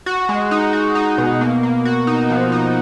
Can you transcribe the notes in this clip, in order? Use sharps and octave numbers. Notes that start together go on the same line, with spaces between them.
F#4
G#3
D#4
F#4
D#4
B2
A#3
A#3
F#4
D#4
F3
D#4